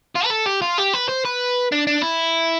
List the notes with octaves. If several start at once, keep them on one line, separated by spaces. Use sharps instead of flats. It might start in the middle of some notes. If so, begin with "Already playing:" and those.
F4
B4
A4
G4
F4
G4
B4
C5
B4
D4
D4
E4